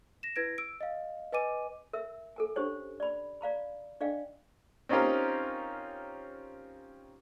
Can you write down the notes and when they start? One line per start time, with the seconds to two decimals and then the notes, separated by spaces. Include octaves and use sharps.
0.23 A#6 E7
0.36 E4 B4 G#6 A#6 D7
0.58 E6 D7
0.81 D#5 F5
1.33 B4 D#5 G#5 D6 D#7
1.93 A#4 E5 E6
2.36 A4 A#4 G#5
2.56 C#4 D4 G4 C5 C#5 G#5
3.00 D5 B5
3.41 D5 F5 A#5 B5
4.01 D4 D5 D#5 F5 G5 G#5
4.89 C4 C#4 D#4 F4 G4 A#4